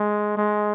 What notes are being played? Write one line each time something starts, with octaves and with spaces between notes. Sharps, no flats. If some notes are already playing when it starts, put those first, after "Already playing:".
Already playing: G#3
G#3